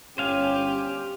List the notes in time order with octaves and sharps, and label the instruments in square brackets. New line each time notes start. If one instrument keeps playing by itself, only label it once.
[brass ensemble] G1 C#4 [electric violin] G4 [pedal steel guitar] C5 F5 G#5